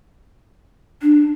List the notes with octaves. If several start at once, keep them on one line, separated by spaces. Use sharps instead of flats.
D4